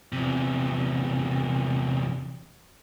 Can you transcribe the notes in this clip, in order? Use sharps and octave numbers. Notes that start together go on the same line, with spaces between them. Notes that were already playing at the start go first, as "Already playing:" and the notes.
E2 C3